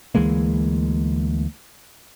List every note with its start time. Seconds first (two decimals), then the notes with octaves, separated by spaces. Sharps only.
0.15 D2 E3 G#3 A#3